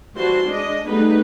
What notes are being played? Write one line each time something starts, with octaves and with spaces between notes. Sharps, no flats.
E3 G3 F#4 C5 A5 C6
G#3 D4 D#5
G3 A3 B3 D#4 G#4 B4